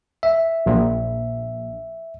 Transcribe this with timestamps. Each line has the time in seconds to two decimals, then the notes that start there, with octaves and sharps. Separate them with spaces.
0.23 E5
0.66 A#1